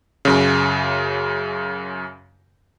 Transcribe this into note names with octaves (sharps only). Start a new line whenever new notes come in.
F#2 C#3